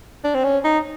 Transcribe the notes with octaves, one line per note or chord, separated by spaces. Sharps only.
D4
C4
C#4
D#4